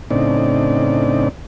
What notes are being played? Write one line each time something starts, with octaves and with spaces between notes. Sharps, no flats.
A2 C#3 C4 D4 D#4 D5